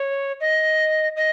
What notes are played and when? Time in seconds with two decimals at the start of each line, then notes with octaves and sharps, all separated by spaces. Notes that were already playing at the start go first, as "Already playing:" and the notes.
Already playing: C#5
0.41 D#5
1.16 D#5